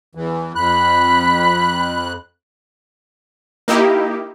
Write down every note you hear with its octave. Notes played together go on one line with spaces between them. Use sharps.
E2 E3
F2 B5 F#6
A#3 D#4 E4 G4